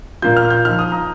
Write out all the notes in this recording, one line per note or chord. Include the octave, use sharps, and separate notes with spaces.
A#2 A#3 F4 G6
F6
G6
F3 D#4 F6
D#6
A#5